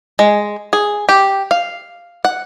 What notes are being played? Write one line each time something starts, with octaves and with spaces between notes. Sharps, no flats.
G#3
G#4
G4
F5
F#5